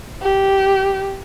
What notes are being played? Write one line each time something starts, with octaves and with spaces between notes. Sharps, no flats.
G4